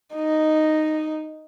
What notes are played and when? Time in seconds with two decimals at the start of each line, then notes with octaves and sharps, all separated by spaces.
0.15 D#4